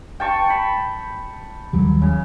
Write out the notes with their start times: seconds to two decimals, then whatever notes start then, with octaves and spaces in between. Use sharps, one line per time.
0.20 G5 A5 C#6
0.50 B5
1.73 D#2 F#3 G3
2.02 C#3